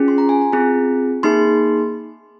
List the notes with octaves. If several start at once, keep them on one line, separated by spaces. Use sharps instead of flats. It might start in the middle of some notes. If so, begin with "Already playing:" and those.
Already playing: C#4 F4 G#4
C6
A#5
G#5
A#5
C4 F4 G#4
A#3 D#4 G#4 C6